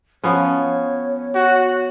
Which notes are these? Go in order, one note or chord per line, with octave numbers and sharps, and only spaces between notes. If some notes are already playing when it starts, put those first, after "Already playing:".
F3 B3 C#4 C#5
F#4